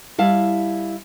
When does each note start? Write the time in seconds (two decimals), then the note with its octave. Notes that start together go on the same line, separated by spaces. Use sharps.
0.18 G3 E4 F5 A5